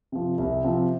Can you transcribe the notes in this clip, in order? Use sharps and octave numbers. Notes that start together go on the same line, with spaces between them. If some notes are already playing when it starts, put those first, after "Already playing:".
C3 F3
C2
C3 F3